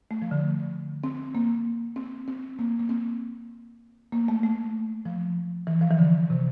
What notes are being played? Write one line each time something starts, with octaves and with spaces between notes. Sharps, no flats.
A3
F3
D3
D3
C4
A#3
C4
C4
A#3
A#3
C4
A#3
A3
A3
F3
E3
F3
E3
D3
C3